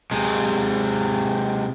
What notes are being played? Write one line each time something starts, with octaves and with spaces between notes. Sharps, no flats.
C3 G#3